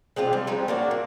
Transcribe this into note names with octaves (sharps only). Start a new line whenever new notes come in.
G#3 C4 D4 F4
G3
F3 G#3 C4 D#4
A#3 D4 F#4
A#2